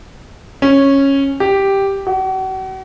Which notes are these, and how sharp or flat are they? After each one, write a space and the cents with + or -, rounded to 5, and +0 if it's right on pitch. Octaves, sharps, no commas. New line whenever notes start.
C#4 -10
G4 +0
F#4 +40